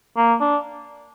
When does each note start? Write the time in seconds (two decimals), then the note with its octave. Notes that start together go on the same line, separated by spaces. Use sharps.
0.17 A#3
0.40 D4